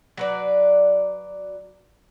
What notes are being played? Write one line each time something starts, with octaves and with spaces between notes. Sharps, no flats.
F#3 B4 D5